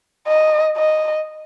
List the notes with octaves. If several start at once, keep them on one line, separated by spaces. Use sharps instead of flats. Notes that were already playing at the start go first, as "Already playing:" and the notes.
D#5
D#5